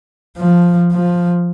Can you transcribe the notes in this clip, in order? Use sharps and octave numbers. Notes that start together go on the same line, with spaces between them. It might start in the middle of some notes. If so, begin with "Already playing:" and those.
F3
F3